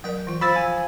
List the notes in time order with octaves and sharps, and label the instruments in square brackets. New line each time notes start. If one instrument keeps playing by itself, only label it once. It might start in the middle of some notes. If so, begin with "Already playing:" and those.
[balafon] F#3 A#4 D5 [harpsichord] G5
[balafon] E3 F4
[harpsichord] F3 [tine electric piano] B5 E6 A6
[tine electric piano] G#5